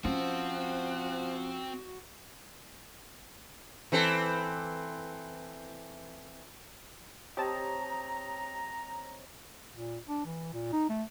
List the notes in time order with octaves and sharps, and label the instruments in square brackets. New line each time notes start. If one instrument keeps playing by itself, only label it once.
[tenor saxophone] F3 [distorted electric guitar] C4 [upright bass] C#4 [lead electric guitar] F#4
[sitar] E3 C4 A4
[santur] C4 C#5 D#5 [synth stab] G4 A5 [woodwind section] A#5
[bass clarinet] A#2
D4
E3
A#2
D#4
A3